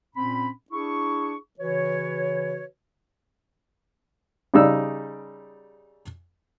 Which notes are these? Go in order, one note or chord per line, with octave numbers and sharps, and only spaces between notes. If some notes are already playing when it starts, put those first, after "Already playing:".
A#2 C4 C#4 B5
D4 E4 G#4 C#6
C#3 E3 F#4 B4 C#5
C#3 G3 D#4 E6